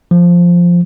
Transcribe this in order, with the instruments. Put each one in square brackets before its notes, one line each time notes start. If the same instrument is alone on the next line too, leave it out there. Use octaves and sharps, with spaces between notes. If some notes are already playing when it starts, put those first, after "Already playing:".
[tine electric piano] F3